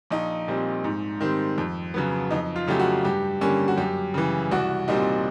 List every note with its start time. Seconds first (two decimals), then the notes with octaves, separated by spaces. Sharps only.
0.11 A#1 D#4
0.48 A#2 G3 C4
0.84 G#2
1.21 D#3 G3 C4
1.58 F2
1.94 C#3 F#3 B3
2.31 F2 D#4
2.56 F4
2.68 C#3 F#3 A3 G4
2.79 F#4
3.05 G2 G4
3.41 D3 G3 A#3 C#4
3.68 F#4
3.78 F#2 G4
4.14 C#3 E3
4.51 C2 F#4
4.88 A#2 G3 C4 D#4